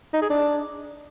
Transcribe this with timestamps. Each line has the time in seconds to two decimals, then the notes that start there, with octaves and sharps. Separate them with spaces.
0.13 D#4
0.22 G#4
0.30 D4